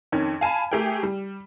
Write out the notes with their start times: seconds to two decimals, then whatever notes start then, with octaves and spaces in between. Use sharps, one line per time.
0.12 F2 D#3 C#4 G#6
0.41 F5 G#5 A5 B5
0.72 A3 G4 G#4 A#4 G5
1.03 G3